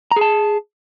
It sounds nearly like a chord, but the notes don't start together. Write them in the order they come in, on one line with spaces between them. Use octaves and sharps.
A#5 G#4 A5